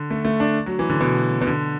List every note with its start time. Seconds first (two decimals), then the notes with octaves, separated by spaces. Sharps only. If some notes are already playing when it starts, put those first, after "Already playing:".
Already playing: D3
0.10 A3
0.25 A3
0.40 D4
0.66 F#3
0.79 E3
0.90 D3
1.01 B2
1.41 B2
1.47 D3